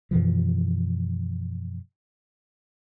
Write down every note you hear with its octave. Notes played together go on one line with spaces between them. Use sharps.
F#2 B2 E3 F3